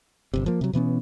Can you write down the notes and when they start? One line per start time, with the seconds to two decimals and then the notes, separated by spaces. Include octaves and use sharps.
0.34 G1 C3
0.46 F3 A#3
0.61 C3 F#3
0.73 B2 E3 B3 C#4